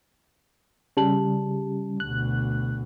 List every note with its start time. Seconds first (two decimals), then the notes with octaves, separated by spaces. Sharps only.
0.97 C#3 G3 G4 A5 F#7
2.00 D2 B2 F#6